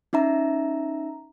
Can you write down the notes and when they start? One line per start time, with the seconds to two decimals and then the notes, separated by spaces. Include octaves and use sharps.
0.13 C#4 D#4 E5 A#5